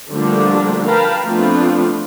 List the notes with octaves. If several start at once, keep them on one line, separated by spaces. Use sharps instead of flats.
D3 F3 G3 A3 A#3 D4
A#4 B4 F5 G5 A5 B5
F3 A3 B3 C4 D4 F4